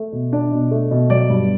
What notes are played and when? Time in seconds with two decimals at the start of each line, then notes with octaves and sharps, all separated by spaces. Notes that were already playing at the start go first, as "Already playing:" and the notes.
Already playing: A3
0.12 B2
0.33 D4 D5
0.51 B2
0.71 A3
0.91 B2
1.10 F#3 D5
1.30 G2